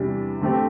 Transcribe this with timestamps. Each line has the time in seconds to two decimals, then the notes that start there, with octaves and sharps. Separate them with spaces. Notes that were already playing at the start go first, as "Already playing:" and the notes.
Already playing: E2 C3 E3 G3 D4
0.41 D3 A3 C4 G4